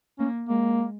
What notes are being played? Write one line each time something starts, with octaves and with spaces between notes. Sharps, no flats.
A#3 C#4
G#3 A#3